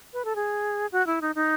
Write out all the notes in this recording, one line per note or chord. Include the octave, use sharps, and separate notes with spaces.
B4
A4
G#4
F#4
E4
D#4
D#4